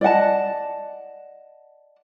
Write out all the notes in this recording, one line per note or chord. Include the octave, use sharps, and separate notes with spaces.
D5 D#5 F#5 A5